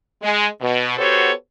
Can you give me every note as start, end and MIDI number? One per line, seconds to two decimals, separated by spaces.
0.23 0.46 56
0.61 0.94 47
0.97 1.31 59
0.97 1.31 66
0.97 1.31 67
0.97 1.31 69
0.97 1.31 72
0.97 1.31 73